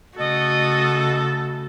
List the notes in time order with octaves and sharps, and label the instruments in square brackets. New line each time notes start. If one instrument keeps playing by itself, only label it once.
[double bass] C#3 A3 [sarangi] F#4 [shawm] A4 [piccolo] D#5